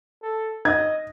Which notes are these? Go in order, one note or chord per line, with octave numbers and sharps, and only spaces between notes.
A4
D#5 G#6